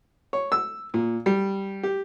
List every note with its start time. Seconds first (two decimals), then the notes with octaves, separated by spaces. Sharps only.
0.33 C#5
0.52 E6
0.94 A#2
1.26 G3
1.83 G4